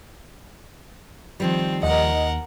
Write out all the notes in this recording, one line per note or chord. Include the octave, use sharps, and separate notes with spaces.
D#3 F3 G3 C4
D#2 A#4 D#5 F#5